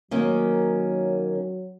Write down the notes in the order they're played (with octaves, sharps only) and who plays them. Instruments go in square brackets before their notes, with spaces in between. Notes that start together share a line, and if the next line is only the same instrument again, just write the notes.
[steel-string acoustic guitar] D#3 A#3 C#4 [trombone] F#3